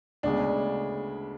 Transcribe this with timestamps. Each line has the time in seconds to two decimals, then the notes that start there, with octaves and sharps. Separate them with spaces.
0.23 D2 C#3 G#3 B3 D4